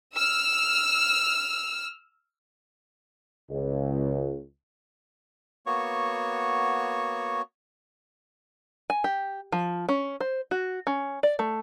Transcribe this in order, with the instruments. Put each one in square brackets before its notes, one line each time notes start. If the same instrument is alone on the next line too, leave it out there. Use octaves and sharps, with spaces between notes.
[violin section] E6 F6
[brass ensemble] C#2
[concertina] A#3 B3 F#4 C#5 C#6
[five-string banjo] G#5
G4
F3
C#4
C5
F#4
C#4
D5
A3